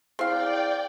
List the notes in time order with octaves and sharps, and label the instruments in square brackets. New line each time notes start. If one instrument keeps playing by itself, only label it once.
[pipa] C4 F5 [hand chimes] E4 G#4 [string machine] D5 G5